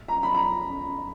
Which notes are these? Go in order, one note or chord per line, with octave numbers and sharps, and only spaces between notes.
A#5
B5
A#5